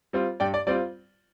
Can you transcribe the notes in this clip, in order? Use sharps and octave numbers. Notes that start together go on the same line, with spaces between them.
G3 C4 F4
G2 D5 G5
D5
G3 C4 F4 D5